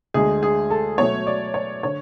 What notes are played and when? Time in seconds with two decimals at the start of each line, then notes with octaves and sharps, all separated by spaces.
0.14 D2 D3 G#3 G#4
0.43 G#4
0.70 A4
0.98 B2 F#3 A3 C#5
1.27 D5
1.54 C#5
1.83 D3 C#5